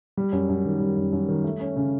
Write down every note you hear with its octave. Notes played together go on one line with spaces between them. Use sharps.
G3
F#2
F#2
D#3
G3
F#2
F#2
D#3
A3
C#4
C#3